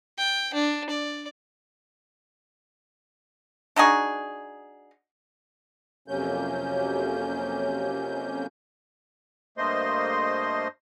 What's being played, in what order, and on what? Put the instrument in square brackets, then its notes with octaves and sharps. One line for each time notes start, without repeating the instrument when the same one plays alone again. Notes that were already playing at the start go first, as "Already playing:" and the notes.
[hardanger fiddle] G5
D4
D5
[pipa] D4 D#4 F#4 G#4
[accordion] F2 C3 F#3 A#3 C#4 G6
G2 A3 A#3 C5 D#5 C6